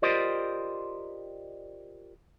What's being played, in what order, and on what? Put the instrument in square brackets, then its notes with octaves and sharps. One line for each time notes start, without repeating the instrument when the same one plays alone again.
[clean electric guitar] F4 G4 A#4 C5 D5 D#5